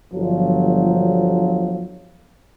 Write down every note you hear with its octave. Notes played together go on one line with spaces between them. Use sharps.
G1 F3 F#3